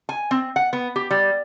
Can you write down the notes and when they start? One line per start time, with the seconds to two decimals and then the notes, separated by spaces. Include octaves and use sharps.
0.09 G#5
0.31 C4
0.56 F#5
0.73 B3
0.96 G4
1.11 G3